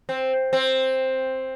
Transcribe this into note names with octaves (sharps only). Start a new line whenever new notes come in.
C4
C4